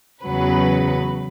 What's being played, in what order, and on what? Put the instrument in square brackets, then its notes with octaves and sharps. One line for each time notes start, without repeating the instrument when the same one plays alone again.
[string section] E2 C#3 F#3 B4